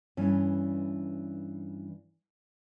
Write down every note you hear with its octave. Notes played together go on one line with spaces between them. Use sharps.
G2 E3 C#4